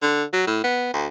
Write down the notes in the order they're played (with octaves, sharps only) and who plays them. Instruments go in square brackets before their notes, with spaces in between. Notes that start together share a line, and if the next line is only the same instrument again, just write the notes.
[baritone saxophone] D3
F#3
A2
B3
D2